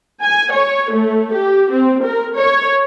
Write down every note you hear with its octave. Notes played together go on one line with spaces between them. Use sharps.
G#5
C#5
A3
G4
C4
A#4
C#5